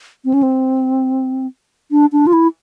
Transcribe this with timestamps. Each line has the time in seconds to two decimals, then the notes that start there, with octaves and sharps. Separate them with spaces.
0.25 C4
0.34 C#4
0.43 C4
1.91 D4
2.12 D4
2.27 F4
2.33 E4